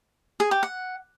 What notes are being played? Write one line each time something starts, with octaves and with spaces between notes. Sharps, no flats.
G#4
G4
F#5